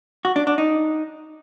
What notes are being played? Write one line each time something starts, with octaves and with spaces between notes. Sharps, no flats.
F#4
D4
D4
D#4